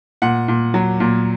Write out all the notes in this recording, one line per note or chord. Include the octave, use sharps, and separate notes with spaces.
A#2 F#5
A#2
F#3
A#2